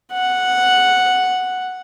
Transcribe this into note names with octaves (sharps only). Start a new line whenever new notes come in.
F#5